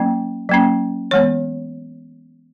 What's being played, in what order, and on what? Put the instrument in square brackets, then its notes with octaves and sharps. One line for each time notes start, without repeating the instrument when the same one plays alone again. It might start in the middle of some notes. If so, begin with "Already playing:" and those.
Already playing: [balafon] F#3 A#3 C#4
F#3 A#3 C#4
E3 G#3 B3 C#5